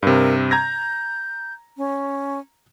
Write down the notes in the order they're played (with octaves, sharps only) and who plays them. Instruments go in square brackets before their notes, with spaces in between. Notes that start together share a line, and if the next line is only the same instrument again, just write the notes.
[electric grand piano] G2 C3 [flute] A#4
[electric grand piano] A#5 G#6 A#6 [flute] G6
[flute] C#4